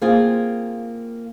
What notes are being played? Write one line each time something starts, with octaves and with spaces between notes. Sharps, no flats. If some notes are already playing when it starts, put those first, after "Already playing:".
A#3 C4 F4 G#4